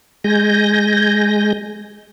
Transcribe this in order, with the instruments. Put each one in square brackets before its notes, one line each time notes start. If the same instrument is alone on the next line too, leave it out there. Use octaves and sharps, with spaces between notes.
[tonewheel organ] G#3 G#5 G6 A#6